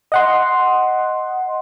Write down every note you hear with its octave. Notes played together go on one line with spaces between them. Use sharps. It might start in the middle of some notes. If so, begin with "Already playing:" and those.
D#5 F#5 C6